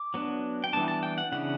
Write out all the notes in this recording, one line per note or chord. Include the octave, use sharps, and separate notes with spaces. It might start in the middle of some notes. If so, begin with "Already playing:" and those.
Already playing: D6
F#3 B3 D4
G5
E3 G3 B3 D4 A5
A5
G5
F#5
C#3 E3 B3 D4 F#5